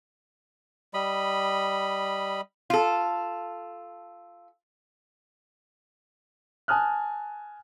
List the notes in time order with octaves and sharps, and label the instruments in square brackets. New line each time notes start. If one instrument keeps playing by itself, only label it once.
[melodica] G3 D#5 B5
[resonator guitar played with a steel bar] F4 A4
[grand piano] G#5 A5 D#6 F6 F#6